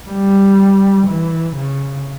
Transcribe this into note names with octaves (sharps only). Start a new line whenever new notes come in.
G3
E3
C#3